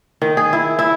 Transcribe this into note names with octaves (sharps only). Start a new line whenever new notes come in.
D#3
G#4
E4
E4